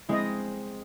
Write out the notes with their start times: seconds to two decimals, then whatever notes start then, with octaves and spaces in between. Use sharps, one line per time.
0.09 G#3 C4 E4 D#5